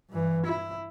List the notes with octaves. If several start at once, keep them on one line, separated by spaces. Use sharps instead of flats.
G2 E3
E4